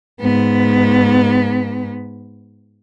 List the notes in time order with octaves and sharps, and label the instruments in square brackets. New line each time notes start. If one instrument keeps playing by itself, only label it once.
[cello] G#2 B3